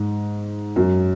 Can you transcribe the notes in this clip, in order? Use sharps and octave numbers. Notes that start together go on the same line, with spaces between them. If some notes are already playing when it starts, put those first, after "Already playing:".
Already playing: G#2
F#2